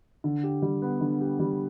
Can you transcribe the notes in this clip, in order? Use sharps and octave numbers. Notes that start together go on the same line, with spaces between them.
D3
G4
G3
B3
D3
G4
G3